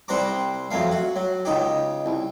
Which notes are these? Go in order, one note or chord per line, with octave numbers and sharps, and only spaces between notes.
C2 G3 C5 F#5 A#5 D6
F2 F#3 A3 F5
F#4
F#3
C#2 D#4 G4
C2